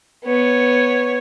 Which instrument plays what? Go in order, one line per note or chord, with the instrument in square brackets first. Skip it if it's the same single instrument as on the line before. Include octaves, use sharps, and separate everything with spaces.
[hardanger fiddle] B3 C#5